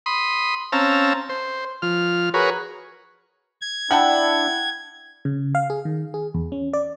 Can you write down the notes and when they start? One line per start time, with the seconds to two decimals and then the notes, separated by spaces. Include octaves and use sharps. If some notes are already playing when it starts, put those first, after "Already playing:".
0.06 B5 C6 D#6
0.72 C4 C#4 F5 A5 A#5 E6
1.29 C5
1.82 F3 F6
2.34 F#4 G#4 A#4 B4 C#5
3.61 G#6
3.91 D4 E4 F#5 G5 A5
5.25 C#3
5.55 F5
5.70 G#4
5.85 D#3
6.14 G#4
6.34 E2
6.52 C#4
6.73 D5